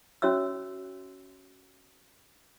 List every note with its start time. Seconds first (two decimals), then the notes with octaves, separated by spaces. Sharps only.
0.22 C#4 F#4 C#5 E5 E6